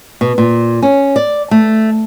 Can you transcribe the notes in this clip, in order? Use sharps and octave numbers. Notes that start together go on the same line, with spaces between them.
B2
A#2
C#4
D5
A3